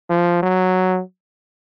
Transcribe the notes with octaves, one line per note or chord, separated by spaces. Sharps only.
F3
F#3